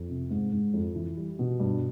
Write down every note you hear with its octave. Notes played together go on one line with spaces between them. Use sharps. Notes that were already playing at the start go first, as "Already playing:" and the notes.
Already playing: F2
C3
G#2
G#2
F2
E3
G3
B2
G2